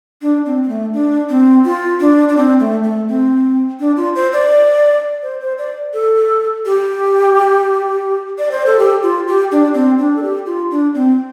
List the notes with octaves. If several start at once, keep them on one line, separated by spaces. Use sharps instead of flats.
D4
C4
C4
A3
D4
C4
F4
D4
D4
C4
A3
A3
C4
D4
F4
C5
D5
C5
C5
D5
A4
G4
D5
C5
A4
G4
F4
G4
D4
C4
D4
A4
G4
F4
D4
C4